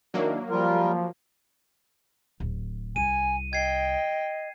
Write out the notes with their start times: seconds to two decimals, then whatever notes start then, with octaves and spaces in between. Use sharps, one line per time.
0.14 D#3 F#3 A#3 D4 E4
0.50 F3 G3 F4 A#4
2.40 D1
2.96 C2 G#5 D#7
3.53 D#5 G5 G#6 C7